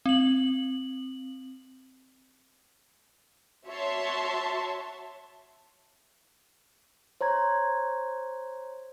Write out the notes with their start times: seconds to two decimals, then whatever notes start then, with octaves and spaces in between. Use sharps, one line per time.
0.06 C4 F#7
3.67 F#4 C#5 E5 A5 C6
7.21 C5 C#5 A#5 G#6